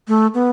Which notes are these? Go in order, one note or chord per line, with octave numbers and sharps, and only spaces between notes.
A3
B3